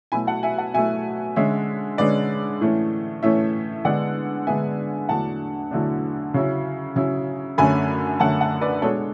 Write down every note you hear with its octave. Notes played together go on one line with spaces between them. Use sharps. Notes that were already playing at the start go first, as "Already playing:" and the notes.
B2 F#3 A3 E4 G#5 B5
F#5 A5
E5 G#5
F#5 A5
B2 F#3 A3 E4 E5 G#5
D3 G#3 C#4 C#5 E5
D3 G#3 C#4 B4 D5
A2 E3 A3 C#4
A2 E3 A3 C#4 C#5 E5
D3 G#3 B3 D4 D5 F#5
D3 G#3 B3 D4 E5 G#5
E2 D3 F#3 A3 D4 F#5 A5
E2 D3 F#3 A3 D4
C#3 F#3 C#4 E4
C#3 F#3 C#4 E4
F#2 D3 A3 C#4 G#5 B5
F#2 D3 A3 C#4 F#5 A5
F#5 A5
B4 D5
B2 G#3 D4 A4 C#5